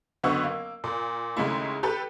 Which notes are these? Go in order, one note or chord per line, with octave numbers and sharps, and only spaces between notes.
F#1 D3 B3 F#4 C#6 E6
A#3
A#2
D#2 C#3 G#3 A3 E4
G4 A4 B4